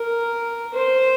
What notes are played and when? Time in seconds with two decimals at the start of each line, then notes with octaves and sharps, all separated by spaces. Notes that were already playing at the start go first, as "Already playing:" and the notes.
Already playing: A#4
0.74 C5